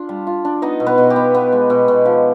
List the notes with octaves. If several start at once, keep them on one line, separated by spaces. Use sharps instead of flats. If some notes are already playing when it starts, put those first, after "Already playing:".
Already playing: D4 F4
G3
F4
D4
B3 D#4 D#5
B2
B3 B4
B2
G4
B3
B3
G#3
B2
B2
F3